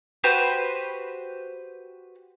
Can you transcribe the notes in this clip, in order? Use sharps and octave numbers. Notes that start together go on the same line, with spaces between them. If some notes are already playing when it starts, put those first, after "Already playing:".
F#4 G4 B4 C5